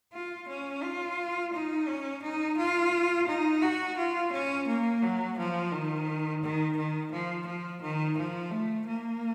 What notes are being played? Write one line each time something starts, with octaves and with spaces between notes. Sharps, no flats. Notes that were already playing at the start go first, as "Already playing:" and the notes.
F4
C#4
F4
D#4
C#4
D#4
F4
D#4
F#4
F4
C#4
A#3
F#3
F3
D#3
D#3
D#3
F3
F3
D#3
F3
A3
A#3